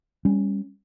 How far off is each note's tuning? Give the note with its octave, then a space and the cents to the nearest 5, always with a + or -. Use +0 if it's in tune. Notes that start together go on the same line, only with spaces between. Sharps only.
G3 +25 C#4 +0